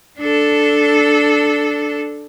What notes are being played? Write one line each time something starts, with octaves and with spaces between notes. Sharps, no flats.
D4 A4